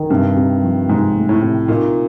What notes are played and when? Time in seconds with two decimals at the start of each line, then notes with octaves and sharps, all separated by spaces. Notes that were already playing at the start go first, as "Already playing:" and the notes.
Already playing: D#3
0.10 G2 C3
0.37 C3
0.63 F3
0.89 G#2 C3
1.16 A3
1.29 A2
1.42 C3
1.68 A#2 D#4